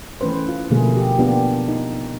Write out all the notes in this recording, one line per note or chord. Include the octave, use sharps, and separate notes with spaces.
E3 A3 C#4 B4 C5
F4
B2 D3 F3 A3 A#3 G#4
G4
A#3 B3 D4 F4 G4
D#4